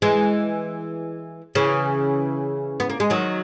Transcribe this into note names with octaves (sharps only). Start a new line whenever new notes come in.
E3 G#3
C#3 E3
B3
A#3
G#3
D#3 F#3